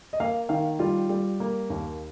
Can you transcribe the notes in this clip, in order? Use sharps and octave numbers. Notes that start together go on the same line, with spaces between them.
D#5
A#3 F5
D#3 F5
G3 F4
G3
A#3
D#2